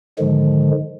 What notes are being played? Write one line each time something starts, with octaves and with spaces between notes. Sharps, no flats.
G#2 D3 D#3 F3 G#3